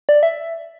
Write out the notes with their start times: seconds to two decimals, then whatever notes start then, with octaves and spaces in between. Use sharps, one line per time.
0.09 D5
0.23 E5